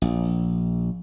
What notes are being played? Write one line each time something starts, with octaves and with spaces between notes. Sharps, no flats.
A#1